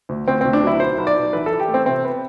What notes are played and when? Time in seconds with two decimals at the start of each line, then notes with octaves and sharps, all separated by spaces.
0.09 D2
0.27 D2 C4
0.41 D2 C4
0.53 D4
0.63 F#3 E4
0.80 B1 C5
0.98 B1
1.07 D5
1.16 B1
1.33 E3 B4
1.46 A4
1.52 E3
1.60 G4
1.68 A3
1.74 C4
1.86 C3 C4
2.05 B3